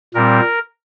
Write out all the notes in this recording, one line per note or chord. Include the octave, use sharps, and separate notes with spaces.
A#2 G3 C4 A#4